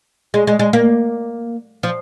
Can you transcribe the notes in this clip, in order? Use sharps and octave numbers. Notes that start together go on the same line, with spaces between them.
G#3
G#3
G#3
A#3
F3